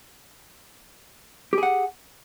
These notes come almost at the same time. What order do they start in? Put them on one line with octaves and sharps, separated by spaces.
G4 G#4 F#5